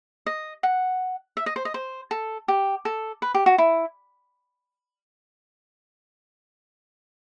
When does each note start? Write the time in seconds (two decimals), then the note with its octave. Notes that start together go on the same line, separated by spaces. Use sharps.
0.26 D#5
0.63 F#5
1.37 E5
1.46 D#5
1.56 C5
1.65 D#5
1.74 C5
2.11 A4
2.48 G4
2.85 A4
3.22 B4
3.34 G4
3.46 F#4
3.58 E4